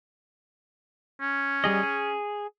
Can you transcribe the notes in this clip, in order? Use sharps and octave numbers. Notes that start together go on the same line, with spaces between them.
C#4
G3 G#4 D#5
G#4